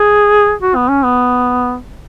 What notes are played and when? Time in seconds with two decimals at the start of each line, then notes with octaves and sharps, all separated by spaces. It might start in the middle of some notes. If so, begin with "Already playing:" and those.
Already playing: G#4
0.61 F#4
0.76 B3
0.89 C#4
1.03 B3